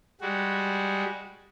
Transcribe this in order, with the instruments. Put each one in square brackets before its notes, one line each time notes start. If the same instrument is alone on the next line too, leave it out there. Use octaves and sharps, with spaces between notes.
[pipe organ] G3 G#3 F#4